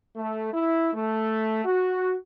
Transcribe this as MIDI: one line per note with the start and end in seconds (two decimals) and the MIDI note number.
0.16 0.54 57
0.54 0.90 64
0.94 1.64 57
1.65 2.15 66